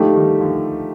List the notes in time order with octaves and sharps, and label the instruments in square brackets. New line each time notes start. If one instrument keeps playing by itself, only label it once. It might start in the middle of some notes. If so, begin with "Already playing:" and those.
Already playing: [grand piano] D3 F3 [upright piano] A3 D#4 G4
[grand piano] D#3 G3
D3 F3